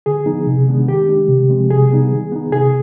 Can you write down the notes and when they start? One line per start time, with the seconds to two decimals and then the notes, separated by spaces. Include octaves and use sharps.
0.06 D3 G#4
0.26 F3 B3 D#4
0.47 C3
0.68 D#3 G#3 B3 D4
0.88 D#3 G4
1.08 G#3 D4
1.29 C3
1.49 F3 G#3 C4
1.70 C3 G#4
1.90 G3 B3 D#4
2.12 D#3
2.32 B3 D#4
2.52 C3 G#4